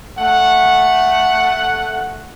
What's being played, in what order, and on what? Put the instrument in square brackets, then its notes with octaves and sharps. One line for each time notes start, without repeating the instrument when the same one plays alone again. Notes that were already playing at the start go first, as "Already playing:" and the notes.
[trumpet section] A3 F#5